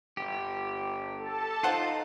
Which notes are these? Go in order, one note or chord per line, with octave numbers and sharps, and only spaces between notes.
G1 G4
A4 A5
D#4 F4 C5 F#5 C6